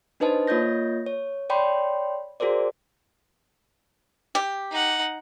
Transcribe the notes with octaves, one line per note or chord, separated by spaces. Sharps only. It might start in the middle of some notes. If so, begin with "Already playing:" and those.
D4 D#4 B4 C5 D#5 A5
A#3 F4 C#5 D#5 G6 A#6
C#5
C#5 D5 G5 B5 C6
F#4 G#4 A#4 C5 D5
G4
D#4 F#5